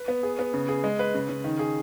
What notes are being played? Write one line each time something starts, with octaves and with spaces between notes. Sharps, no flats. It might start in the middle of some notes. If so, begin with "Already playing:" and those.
Already playing: B4
B3
G#4
B3
C#3
G#4
G#3
B4
C#3
C#3
D#3
G#4